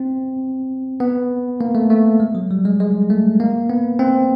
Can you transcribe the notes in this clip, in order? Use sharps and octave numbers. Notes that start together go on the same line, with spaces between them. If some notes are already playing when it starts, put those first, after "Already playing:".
Already playing: C4
B3
A#3
A3
A3
G#3
F#3
G3
G#3
G#3
A3
A#3
B3
C4